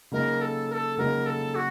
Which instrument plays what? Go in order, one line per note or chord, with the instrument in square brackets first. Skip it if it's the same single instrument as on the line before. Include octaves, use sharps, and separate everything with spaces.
[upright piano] C#3 F#3 A#3 D#4 [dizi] A#4
[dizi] A4
A#4
A4
[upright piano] C#3 F#3 A#3 D#4 [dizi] A#4
[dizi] A4
F#4